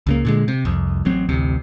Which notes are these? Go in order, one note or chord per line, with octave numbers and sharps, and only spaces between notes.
C#2 C#3 A#3
A#2 D3 G#3
C3
C2 F2
A1 F#3 C4
A1 D2 C3